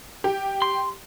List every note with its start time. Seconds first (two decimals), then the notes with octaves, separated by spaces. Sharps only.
0.24 G4
0.62 C6